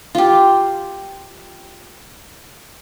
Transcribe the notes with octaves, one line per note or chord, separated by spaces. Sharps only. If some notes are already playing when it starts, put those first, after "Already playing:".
F4 G4